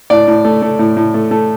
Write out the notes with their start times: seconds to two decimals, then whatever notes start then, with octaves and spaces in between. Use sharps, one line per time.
0.10 A2 D5
0.28 A2
0.45 A3
0.62 A3
0.79 A2
0.97 A2
1.14 A3
1.31 A3